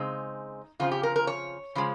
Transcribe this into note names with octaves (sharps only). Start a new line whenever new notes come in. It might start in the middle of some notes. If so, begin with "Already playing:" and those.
Already playing: C#3 G#3 C4 D#4
C#3 F3 C4 F4
G4
A#4
A#4
C#5
C#3 F3 G#3